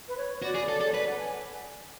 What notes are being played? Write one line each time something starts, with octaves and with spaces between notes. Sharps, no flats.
B4
C#5
F#4 D5
G#4
A4
A4
C#5
B4 D5
F#5
G#5